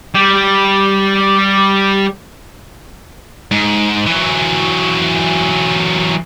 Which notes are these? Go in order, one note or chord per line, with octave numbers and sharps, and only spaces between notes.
G3 G4
G#2
E3 F#3